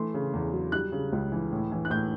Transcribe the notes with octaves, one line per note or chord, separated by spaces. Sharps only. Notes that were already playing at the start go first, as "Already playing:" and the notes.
Already playing: E3 A3 C6
C#3
E2
F#3
G3 F#6
C#3
C#2
E3
A2
E3
F#6
A2 G6